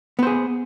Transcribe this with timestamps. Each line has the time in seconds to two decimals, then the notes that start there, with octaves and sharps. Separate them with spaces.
0.19 B3
0.23 C5
0.27 G#4